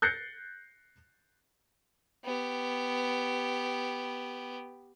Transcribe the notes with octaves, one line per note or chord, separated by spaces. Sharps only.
F#6 G6 A6 A#6 C7 C#7
B3 G4